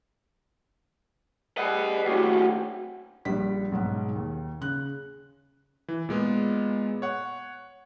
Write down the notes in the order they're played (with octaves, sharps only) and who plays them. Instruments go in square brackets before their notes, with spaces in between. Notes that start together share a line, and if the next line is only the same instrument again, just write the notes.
[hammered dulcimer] G3 G#4 B4 [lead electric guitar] D#5 F#5
[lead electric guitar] D#2 A2 [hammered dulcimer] C4 C#4 G4 [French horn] F#4
[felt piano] A#1 G3 B6
B1 G#2 F#5
D#2
C#3 F#6
[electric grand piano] E3
A#2 G#3 B3
C#5 F#5